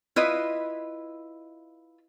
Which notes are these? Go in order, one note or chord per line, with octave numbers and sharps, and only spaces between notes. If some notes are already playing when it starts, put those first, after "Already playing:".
E4 F4 B4 D#5